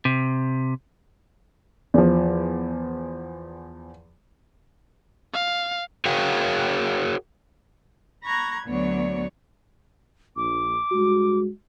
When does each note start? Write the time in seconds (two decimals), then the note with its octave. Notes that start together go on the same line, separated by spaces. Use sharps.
0.05 C3
1.94 E2 F3
5.33 F5
6.06 F#4 G#4 A#4 C#5 F5 G5
8.24 A#5 B5 C#6 F#6 G#6 A#6
8.66 D2 F#3 B3 C#5 D5 C#6
10.36 A#1 D6
10.92 G2 G#3 F#4